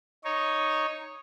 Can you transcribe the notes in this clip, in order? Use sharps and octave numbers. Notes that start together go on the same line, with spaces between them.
D#4 C#5